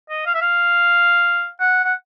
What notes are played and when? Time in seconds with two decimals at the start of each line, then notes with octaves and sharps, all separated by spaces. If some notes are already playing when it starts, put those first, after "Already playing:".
0.10 D#5
0.26 F5
0.34 E5
0.41 F5
1.60 F#5
1.84 F#5